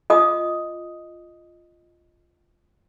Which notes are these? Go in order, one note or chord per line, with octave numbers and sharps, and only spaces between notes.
F4 D#5 D6 D#6